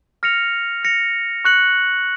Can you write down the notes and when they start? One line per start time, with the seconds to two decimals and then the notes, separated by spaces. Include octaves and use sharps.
0.23 F6 A#6 C#7 F7
0.83 F6 A#6 C#7 F7
1.45 C#6 F#6 C#7 F#7